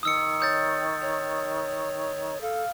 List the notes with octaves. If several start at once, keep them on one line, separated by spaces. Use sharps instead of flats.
D#3 D#6 E6 C#7
C#5 D#6 G6 A6
C#5
A4 F5